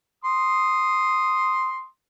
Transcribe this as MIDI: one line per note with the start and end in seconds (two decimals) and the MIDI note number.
0.24 1.85 84
0.24 1.85 87